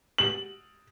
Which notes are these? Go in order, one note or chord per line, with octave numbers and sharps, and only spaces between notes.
F#7